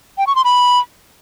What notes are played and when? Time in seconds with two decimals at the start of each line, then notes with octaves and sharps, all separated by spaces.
0.18 G5
0.27 C#6
0.36 C6
0.45 B5